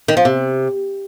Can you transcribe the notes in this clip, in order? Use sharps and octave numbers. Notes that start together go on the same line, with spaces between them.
D#3
F3
C3